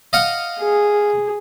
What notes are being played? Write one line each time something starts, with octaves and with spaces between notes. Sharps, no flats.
D#5 F5 F#5
G#4